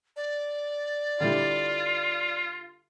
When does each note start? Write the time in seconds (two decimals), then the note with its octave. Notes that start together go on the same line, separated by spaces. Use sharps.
0.16 D5
1.20 D3 G3 E4 F4